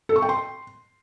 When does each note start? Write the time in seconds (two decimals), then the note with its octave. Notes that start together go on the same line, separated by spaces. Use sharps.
0.09 A4
0.16 C#6
0.22 G5
0.29 C6